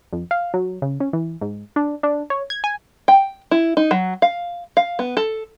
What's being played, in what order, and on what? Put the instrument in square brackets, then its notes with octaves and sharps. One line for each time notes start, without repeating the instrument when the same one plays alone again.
[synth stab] F2
F5
F#3
C#3
C#4
E3
G#2
D4
D4
C#5
G#6
G#5
[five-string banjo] G5
E4
D#4
F#3
F5
F5
B3
A4